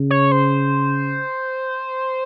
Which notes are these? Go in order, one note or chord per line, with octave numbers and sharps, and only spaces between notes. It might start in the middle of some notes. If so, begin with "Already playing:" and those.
Already playing: C#3
C#5
C5